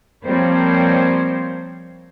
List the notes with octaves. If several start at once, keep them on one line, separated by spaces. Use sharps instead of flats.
F3 G3 A#3 C4 C5 C#5